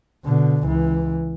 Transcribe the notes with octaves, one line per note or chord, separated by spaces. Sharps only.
B2 D3
C#2 E3